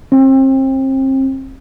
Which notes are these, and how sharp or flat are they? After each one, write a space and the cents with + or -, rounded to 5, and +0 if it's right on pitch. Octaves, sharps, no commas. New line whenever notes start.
C4 +35